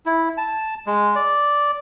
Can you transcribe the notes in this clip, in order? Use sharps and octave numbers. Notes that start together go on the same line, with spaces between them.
E4
A5
G#3
D5